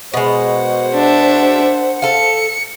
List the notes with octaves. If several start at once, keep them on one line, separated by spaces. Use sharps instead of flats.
B2 G#3 C5 F#5
D4 E5
A4 F5 C#7